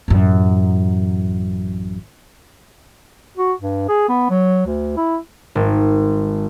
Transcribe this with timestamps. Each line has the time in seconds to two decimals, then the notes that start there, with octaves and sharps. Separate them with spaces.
0.08 A1 F#2
3.37 F#4
3.61 G2
3.89 G#4
4.09 B3
4.31 F#3
4.66 D2
4.97 E4
5.55 G#1